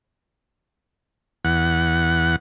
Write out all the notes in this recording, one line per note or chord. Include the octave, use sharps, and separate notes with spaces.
E2 F#5